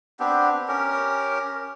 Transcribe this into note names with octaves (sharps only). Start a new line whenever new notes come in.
B3 C4 D4 G4
C#4 G4 A#4